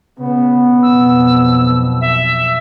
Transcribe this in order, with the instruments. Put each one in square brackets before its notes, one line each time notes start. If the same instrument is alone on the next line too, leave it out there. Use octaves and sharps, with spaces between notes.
[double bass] C#3 [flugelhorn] B3
[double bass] B1 F2 [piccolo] E6
[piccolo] E5